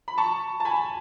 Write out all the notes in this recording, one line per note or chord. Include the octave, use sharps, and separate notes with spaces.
B5
A5 C#6
A5
G#5 B5